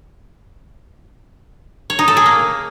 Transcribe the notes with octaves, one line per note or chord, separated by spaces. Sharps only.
C#5
D#4
A4
G#4
A#3